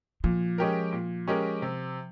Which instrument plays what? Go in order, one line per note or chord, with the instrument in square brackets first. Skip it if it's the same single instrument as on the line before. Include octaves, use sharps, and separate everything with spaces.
[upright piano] A#2 [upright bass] F3
[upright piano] G#3 C#4 G4 A#4
A#2
G#3 C#4 G4 A#4
C3